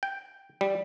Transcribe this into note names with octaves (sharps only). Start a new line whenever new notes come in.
G5
G3